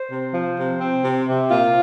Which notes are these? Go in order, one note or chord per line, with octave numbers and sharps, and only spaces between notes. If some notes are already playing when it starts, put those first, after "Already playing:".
Already playing: C5
C3
F3
C3
C4
C3
C3
A#2 F4